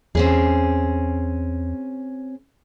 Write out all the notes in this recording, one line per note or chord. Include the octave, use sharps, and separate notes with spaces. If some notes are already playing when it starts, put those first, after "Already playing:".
E2 C4 C#4 G#4